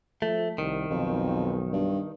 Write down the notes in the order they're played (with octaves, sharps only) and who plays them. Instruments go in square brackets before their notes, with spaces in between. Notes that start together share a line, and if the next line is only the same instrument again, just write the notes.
[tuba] F3 [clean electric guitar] A3
[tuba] C2 [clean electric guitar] D#3
[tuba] B1 [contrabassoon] F2
[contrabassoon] G2